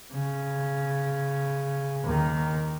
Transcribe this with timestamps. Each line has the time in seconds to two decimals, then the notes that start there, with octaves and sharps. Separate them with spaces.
0.13 C#3
2.04 D#2 D#3